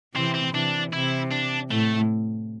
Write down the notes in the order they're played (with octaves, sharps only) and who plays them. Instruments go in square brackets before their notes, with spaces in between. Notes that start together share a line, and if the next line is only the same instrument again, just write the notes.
[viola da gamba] C3 E3 [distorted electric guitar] C4
[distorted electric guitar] C4
[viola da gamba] C3 E3 [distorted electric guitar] D4
[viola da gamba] C3 [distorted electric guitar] E4
[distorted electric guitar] D4
[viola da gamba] A2 [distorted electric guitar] A3